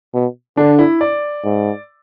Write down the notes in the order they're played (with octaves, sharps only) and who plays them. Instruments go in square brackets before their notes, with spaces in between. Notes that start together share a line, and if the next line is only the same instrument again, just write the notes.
[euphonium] B2
[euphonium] D3 [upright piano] D4
[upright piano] E4
D5
[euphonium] G#2